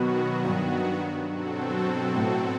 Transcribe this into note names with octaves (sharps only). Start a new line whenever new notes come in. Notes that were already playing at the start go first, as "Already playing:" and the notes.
Already playing: B2 D#3 F#3 B3 F#4
G2
B2 F#3 C4 F#4 A4
A2